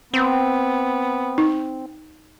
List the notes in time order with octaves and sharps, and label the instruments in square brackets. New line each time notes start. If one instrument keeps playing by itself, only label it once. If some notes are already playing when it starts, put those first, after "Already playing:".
[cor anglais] B3 [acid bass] C4
[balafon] D#4